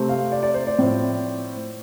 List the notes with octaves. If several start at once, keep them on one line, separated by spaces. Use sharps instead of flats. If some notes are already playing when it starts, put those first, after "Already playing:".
Already playing: C3 A3 C4
F5
D5
D5
C5
D5
A2 F3 C4